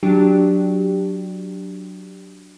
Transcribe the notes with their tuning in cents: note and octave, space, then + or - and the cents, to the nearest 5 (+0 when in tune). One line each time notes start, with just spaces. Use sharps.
F#3 +0 D4 +0 G4 +0